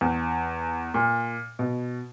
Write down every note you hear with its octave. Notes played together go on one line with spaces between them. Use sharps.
E2
A#2
B2